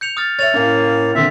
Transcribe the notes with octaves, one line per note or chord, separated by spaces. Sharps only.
G6 C#7 F7
D#6 F6 A6
C#5 E5 A6 F7
A2 A#3 C#4 F5
A#2 D3 C4 E5